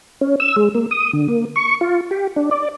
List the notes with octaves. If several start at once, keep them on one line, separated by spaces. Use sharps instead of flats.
C#4
E6
G#3
A#3
D#6
D3
A#3
C#6
F4
G4
D4
D5